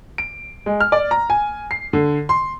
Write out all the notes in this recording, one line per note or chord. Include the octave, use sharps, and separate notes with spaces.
D7
G#3
F6
D5
A#5
G#5
C7
D3
C6